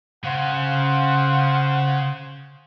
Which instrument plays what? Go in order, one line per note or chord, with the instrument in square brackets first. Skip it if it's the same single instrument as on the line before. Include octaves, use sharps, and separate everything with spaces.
[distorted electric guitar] C#3 [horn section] C5 F5 F#5